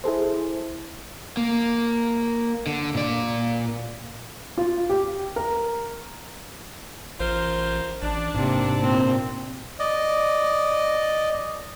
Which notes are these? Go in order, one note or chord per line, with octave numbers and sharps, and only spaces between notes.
E4 G#4 A4 C5
A#3
D3
A#2 D5
F4
G4
A#4
A1 F4 A#4 C5
A1 D4
G#2 C3 A#3
A#2 C4
D5 D#5